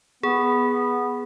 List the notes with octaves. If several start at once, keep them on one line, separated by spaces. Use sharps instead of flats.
B3 G#4